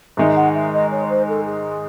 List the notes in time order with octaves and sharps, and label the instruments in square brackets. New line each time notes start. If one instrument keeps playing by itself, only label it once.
[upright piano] G#2 D#3 G#3 D#4 [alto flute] E5
[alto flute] F#5
E5
D#5
C#5
C5
A4
G#4